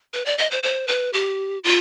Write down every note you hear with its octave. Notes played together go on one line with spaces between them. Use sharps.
B4
D5
D#5
C5
C5
B4
G4
F4